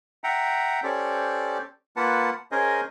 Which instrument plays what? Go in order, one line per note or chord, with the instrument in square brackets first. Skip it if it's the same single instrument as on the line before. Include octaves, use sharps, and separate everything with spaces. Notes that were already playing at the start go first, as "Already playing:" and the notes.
[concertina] E5 F#5 G5 A#5
C#4 G4 A4 C5 D5
A#3 F4 B4 F#5 A5
C#4 G#4 A#4 C5 D#5 G#5